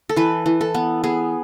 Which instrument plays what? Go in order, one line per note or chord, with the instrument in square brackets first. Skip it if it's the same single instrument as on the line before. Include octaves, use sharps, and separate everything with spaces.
[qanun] A4
E3 B4
E3
A4
B3
B3 G#4